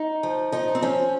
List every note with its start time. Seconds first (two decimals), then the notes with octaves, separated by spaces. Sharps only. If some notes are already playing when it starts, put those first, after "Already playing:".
Already playing: D#4
0.23 F3
0.52 F3 D#4
0.75 C4
0.82 F3 C#4